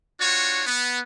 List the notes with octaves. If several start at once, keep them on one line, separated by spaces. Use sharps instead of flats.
D4 F4 F#4 C#5
B3